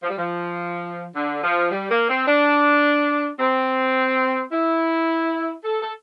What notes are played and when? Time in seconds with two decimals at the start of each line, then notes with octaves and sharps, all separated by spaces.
0.03 F3
0.10 G3
0.18 F3
1.16 D3
1.43 F3
1.71 G3
1.91 A#3
2.09 C4
2.27 D4
3.40 C4
4.52 E4
5.65 A4
5.82 A4